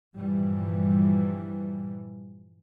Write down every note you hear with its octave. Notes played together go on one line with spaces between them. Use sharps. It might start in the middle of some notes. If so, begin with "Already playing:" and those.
G2 A#2 E3 F3 G3